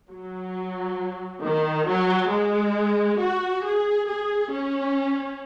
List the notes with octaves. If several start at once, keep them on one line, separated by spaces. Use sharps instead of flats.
F#3
D#3
F#3
G#3
F#4
G#4
G#4
C#4